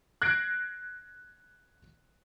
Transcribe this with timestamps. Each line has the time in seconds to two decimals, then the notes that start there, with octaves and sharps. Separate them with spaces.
0.22 F#6 G#6 A#6 C7 D7